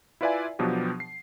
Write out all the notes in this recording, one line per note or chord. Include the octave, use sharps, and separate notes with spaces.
E4 F4 B4 D5 E5 G#5
B2 F3 F#3 B3 D4 G4
C7